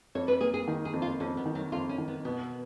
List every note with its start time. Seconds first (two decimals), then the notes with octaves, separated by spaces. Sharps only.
0.15 F2 C#5
0.28 B4
0.41 A#3 G#4
0.54 G#4
0.68 D#3
0.85 G#4
0.93 F2
1.02 F4
1.20 F2 C#4
1.37 B3
1.46 D#3
1.55 F#3
1.72 F2 F4
1.89 C#4
1.98 D#3
2.08 B3
2.25 B2 B3